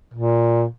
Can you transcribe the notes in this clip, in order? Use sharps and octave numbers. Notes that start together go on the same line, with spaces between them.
A#2